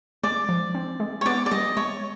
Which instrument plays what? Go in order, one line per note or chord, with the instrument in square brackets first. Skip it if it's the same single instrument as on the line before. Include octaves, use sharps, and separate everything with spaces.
[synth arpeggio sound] G#3 [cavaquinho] D5
[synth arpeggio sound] F3
C4
G#3
[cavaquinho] C#5
[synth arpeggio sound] B3 [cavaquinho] D5
[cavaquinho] D5
[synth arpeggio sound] G3 [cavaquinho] D#5
[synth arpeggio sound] G#3 [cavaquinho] C#5